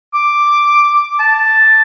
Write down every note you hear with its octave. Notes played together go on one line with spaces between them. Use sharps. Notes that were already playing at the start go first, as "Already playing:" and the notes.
D6
A5